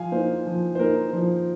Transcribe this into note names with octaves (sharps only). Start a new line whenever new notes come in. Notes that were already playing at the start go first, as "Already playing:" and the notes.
Already playing: F3 F5 G#5
A#3 D#4 C5
F3
C5
A#3 D#4 A#4
F3 C5